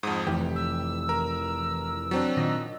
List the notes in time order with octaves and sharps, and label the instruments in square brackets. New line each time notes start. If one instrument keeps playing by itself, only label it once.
[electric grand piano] F2 G#2 [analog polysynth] D#6
[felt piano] F1 [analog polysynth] E3 [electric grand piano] G4
[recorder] E6
[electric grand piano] A#4
F#3 C4 D4
[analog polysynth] A#2 D#3 D#5